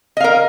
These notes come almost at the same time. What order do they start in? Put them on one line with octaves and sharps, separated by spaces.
D#5 F5 A#4